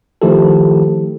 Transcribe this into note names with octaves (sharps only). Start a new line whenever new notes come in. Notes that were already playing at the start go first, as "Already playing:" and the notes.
D#3 F3 A3 E4 G4 A4